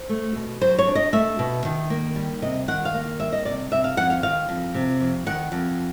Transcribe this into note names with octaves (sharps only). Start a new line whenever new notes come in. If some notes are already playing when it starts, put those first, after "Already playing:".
Already playing: C5
A3
B2
F#3 C5
C#5
D4
D#5
A3 E5
B2
D#3
A#3
G3
C3 D#5
D#3 F#5
F5
A#3
G3 E5
D#5
C3 D5
C3 E5
F5
F2 F#5
F5
D#3 F5
F2
C3
F2
D#3 F#5
F2